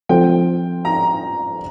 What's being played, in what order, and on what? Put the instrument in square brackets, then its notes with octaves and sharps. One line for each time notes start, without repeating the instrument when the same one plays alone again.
[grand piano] F3 C4 F4 A4 C5 [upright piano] G5
[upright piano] A#5